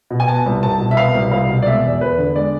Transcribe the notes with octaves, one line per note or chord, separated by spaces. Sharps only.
B2
G#5
B3 A5
C2
C2 A5
B2
E5
B3 F5
C2
C2 F5
B2
D5
G#3 E5
E2
E2 B4
D3
G#3 D5